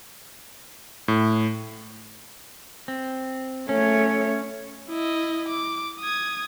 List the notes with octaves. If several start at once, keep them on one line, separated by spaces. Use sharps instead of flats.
A2
C4
A3 C#4 C#5
E4 D#5
D6
D#6 G#6